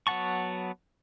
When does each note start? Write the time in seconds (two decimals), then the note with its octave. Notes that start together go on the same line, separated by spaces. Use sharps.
0.07 F#3 B3 F#5 A5 C#6